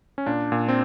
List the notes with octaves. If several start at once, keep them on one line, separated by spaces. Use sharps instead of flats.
C#4
A#2 D4
A#2
C4